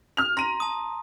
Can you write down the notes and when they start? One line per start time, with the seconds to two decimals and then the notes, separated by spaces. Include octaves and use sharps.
0.17 F6 F7
0.37 A#5 C6 A#6 D#7
0.60 A5 D#6